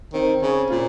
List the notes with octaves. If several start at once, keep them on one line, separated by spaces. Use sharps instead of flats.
D#3 C4
C#3 C#4
A#2 F4